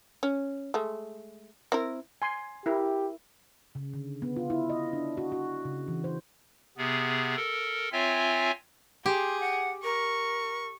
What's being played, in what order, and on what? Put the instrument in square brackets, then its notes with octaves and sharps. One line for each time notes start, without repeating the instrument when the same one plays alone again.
[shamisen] C#4
G#3 A3
C4 E4 A#4
[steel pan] G#5 C6
[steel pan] E4 A#4 [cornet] G4
[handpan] C#3
D3
B3
F4
E4
D#5
D4
F#4
F#4
C#3
E3
C5
[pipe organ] C3 B3 G#4
A4 A#4
C4 F4 C#5 E5 G#5
[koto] G4 [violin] G#4 [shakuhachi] C6
[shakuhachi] F#5
[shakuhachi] A#4 [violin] C#6